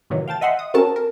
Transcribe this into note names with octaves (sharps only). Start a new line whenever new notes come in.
A2 C3 D#3 E3 F#3
F5 G5 A5 A6
D#5 E5 F#5 C6
D#6
C4 C#4 F#4 A4 A#4 A5
A#4